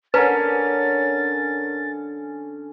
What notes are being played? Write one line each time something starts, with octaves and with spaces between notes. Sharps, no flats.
D3 C#4 A#4 B4 A5 A#5 A6